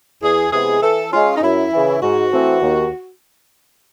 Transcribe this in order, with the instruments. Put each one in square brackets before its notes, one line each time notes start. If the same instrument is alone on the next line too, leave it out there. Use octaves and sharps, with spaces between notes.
[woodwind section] E2 [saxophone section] G#4
[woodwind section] C3 E3 G#3 B3 [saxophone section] G#4
[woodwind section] E3 [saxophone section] A4
[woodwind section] G#3 C#4 [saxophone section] F4
[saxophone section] D#4
[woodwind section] F#2 [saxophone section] E4
[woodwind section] C#3 E3
[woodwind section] G#2 [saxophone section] F#4
[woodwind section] E3 A3 C4
D#2